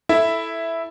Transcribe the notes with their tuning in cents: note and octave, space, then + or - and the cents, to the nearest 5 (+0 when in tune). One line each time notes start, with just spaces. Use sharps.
E4 +0 A4 -5 E5 +0